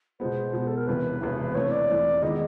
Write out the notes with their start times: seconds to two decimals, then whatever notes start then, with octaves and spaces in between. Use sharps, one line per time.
0.20 B2 G#3 B3 C5
0.53 B2 G#3 B3
0.67 A4
0.77 A#4
0.87 E1 E2 C3 E3 B4
1.21 E1 E2 C3 E3
1.55 E3 A3 C4 C#5
1.71 D5
1.88 E3 A3 C4
2.22 D#3 G#3 B3 E4 D#5